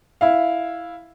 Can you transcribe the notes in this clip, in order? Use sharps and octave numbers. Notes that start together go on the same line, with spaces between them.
E4 F5